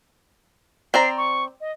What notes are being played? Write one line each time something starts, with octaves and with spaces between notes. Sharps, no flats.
C4 D5 A#5 C7
C#6
D#5